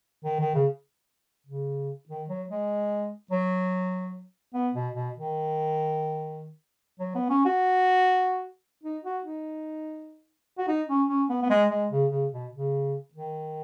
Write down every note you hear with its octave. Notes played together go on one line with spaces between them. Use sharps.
D#3
D#3
C#3
C#3
D#3
F#3
G#3
F#3
B3
B2
B2
D#3
F#3
B3
C#4
F#4
D#4
F#4
D#4
F#4
D#4
C#4
C#4
B3
B3
G#3
G#3
C#3
C#3
B2
C#3
D#3